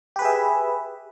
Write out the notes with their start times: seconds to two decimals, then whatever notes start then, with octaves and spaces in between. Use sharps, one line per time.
0.16 G4
0.19 B4
0.22 G#4
0.25 E5